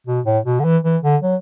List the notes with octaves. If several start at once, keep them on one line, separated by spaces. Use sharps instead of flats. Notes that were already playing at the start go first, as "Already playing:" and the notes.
B2
A2
B2
D3
E3
E3
D3
F#3